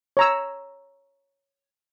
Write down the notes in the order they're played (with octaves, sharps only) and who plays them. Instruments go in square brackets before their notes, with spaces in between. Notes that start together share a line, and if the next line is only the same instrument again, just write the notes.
[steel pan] C#5 A#5 E6